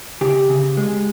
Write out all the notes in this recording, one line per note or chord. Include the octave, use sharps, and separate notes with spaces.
C#3 G4
C#3
G#3